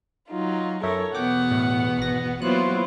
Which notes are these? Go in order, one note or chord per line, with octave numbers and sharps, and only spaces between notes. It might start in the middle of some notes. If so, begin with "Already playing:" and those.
F#3 D#4 F4
F#2 A4 A#4 C#5 E5
E2 B2 B3 F#5 G5 D6
A2
G#1 A#6
F#3 A#3 B3 E4 F4 C5 F#6